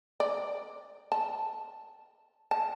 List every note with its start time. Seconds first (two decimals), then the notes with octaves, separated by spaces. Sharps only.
0.20 D5
1.12 A5
2.51 A5